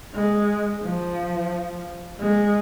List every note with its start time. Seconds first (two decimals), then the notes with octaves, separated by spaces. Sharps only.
0.15 G#3
0.83 F3
2.20 G#3